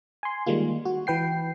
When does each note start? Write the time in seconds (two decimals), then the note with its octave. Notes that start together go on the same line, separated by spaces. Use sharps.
0.23 G#5 C6
0.46 D#3 G3 G#3 A#3 F4
0.85 F#4
1.07 E3 B4 G5 C7